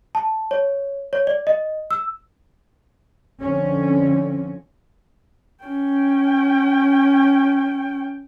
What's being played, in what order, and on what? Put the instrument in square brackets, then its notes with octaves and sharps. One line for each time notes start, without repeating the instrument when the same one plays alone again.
[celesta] A5
C#5
C#5
D5
D#5
E6
[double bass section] D3 F3 C4 C#4
[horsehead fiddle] C#4 G5